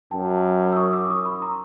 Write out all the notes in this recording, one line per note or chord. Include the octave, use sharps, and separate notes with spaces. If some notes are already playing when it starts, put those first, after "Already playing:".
F#2 G5 A5
E6
C#6 D#6
D6 E6
C#6 D#6
B5 C#6
A#5 C6